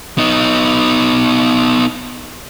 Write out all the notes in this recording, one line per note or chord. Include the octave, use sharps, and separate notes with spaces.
B3 D#4